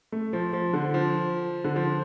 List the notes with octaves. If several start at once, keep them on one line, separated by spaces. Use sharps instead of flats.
A3
F3
F3
D3
F3
D3
F3